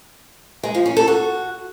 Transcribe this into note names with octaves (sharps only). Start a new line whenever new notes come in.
G#3
F3
C#4
A4
F#4